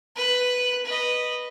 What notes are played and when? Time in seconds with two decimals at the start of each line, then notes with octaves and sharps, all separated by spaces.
0.16 B4 F#6
0.85 B4 D#5